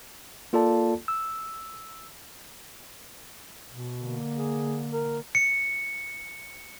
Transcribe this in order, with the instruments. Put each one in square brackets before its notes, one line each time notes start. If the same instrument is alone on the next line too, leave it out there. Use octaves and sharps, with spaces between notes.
[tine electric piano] A#3 F4 A4 D5 A5
E6
[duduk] B2
[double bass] D3 A#3
[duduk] G#4
A#4
[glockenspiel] C#7